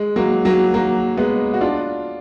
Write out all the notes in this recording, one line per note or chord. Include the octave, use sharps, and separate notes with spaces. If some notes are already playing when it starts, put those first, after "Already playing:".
Already playing: G#3
F#3 A#3
F#3 A#3
F#3 A#3
G#3 B3
F#4
D4 F4